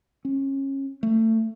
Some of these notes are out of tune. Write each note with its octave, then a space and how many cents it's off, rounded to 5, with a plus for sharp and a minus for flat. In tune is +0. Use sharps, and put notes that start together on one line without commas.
C#4 -25
A3 +25